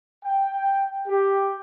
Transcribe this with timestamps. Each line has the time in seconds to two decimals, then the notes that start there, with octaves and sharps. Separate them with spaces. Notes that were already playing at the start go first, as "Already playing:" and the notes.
0.25 G5
1.08 G4